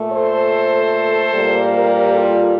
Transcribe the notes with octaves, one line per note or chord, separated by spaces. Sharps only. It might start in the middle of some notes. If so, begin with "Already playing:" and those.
Already playing: A#2 A3
A4 C5
A#2 G3 A#3
G4 A#4
F4 A4